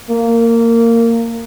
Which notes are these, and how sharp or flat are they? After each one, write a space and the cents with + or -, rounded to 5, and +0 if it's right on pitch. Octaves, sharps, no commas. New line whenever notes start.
A#3 -20